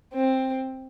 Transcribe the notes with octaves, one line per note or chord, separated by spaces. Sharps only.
C4